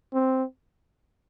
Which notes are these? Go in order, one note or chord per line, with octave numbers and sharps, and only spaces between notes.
C4